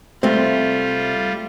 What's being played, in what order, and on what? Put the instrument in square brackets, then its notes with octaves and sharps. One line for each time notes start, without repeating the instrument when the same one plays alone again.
[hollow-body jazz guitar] C2 C4 [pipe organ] G3 F4 [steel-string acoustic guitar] A3